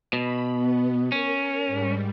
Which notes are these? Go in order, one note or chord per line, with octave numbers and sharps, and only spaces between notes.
B2 B5
B3
C#4 A#4
G#2 G3